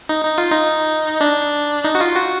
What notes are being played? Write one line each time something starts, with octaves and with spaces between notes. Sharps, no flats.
D#4
D#4
F4
D#4
D4
D#4
F#4
F4
F#4